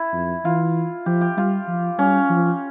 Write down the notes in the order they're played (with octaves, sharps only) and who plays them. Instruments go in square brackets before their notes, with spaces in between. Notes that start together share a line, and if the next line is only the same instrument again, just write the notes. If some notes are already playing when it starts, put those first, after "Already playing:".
Already playing: [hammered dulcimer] E4
[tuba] F2
[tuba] E3 [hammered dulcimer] F4
[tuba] F3 [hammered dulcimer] G4
[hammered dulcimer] G4
[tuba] G3 [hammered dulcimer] F4
[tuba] F3
[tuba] G3 [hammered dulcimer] C#4
[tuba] F3